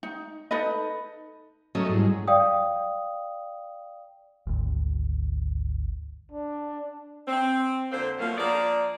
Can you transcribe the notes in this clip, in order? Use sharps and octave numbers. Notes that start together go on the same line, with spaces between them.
D#4
D#4 A4 B4 D#5
F#3 A3 C#4 D#5
G#2 G3 E4 G4
D5 F5 G5 D#6
G#1 D2
D4
C4
F2 D3 A#3 C4 C5
B2 F3 F#3 A3 A#3 F4
F3 A#3 D4 G#4 D5